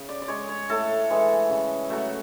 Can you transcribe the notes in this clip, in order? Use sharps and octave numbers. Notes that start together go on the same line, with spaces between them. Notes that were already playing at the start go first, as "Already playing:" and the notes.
Already playing: C#3
D5
D5
G#3 C#5
C#5
A2 A4
E3 G#3
C#3
F#3 A3